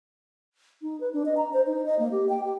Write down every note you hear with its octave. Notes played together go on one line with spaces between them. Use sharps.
D#4
B4
D4
D#5
A#5
C5
D#4
D#5
A#3
G4
G5
G4